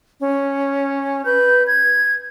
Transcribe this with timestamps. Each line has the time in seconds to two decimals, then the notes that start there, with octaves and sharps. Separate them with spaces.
0.20 C#4
1.25 B4 G6
1.66 G#6